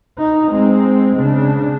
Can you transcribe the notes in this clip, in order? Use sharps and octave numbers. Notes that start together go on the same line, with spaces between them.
D#4
G#3 C4
C#3 D4